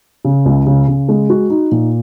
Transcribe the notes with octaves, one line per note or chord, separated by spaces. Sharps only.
C#3
C#2
C#3
C#3
G#3
F#4
D#4
A#2